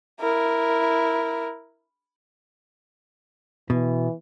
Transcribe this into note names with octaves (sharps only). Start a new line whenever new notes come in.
E4 A#4
B2 E3